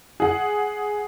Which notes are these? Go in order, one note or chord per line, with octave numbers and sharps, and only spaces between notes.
G#4 F#5